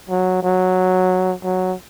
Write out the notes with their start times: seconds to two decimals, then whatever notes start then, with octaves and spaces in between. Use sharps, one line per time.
0.09 F#3
0.43 F#3
1.44 F#3